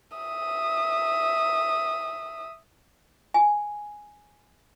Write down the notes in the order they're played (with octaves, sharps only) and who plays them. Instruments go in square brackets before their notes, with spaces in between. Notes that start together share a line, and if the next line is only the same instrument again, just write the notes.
[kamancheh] E5 D#6
[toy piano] G#5